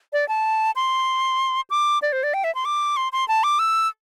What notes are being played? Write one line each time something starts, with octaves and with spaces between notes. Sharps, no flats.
D5
A5
C6
D6
D5
C5
D5
G5
E5
C6
D6
C6
C6
A5
D6
E6